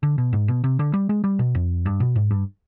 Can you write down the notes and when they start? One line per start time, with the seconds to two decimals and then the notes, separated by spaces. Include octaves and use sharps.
0.03 D3
0.18 B2
0.33 G#2
0.48 B2
0.64 C3
0.79 D3
0.94 G3
1.09 G#3
1.24 G3
1.39 B2
1.55 F2
1.86 G2
2.00 B2
2.16 G#2
2.31 G2